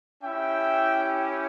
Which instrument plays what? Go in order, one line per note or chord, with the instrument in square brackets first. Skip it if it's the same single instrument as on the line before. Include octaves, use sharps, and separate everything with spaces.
[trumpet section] C#4 E4 G4 E5 G5